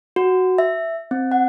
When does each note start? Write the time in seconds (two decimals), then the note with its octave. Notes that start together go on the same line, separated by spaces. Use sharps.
0.16 F#4
0.58 E5
1.11 C4
1.32 F#5